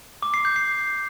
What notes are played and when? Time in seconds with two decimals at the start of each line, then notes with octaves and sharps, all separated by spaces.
0.22 D6
0.34 C7
0.45 G6
0.56 C7